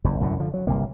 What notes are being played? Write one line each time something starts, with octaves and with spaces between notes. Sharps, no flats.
F#1 E2
C2 F#2 A2 D3
D3 F3
F#3
G1 C2 C3 A#3